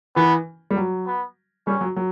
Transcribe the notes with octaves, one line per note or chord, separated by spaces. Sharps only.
E3 B3
G3
F#3
B3
G3 C#4
F#3
F#3